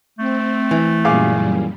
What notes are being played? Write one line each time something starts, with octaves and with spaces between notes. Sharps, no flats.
A3 C4
E3
F#2 A#2 G3 G#4 F5 D6